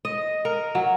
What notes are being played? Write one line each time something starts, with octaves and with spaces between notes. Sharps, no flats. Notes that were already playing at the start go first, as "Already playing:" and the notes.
D#5
A#4
F#3